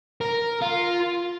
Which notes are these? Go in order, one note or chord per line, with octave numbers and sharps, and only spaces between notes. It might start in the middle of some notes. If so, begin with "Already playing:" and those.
A#4
F4